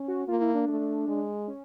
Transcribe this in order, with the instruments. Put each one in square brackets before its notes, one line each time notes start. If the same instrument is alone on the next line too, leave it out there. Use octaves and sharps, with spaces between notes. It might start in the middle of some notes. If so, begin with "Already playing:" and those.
Already playing: [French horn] C#4
[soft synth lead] F#4
[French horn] A#3 [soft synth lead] F4
[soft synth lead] E4
D4
[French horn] A3
G#3
[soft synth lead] C#4